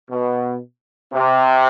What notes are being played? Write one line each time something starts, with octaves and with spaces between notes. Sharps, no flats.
B2
C3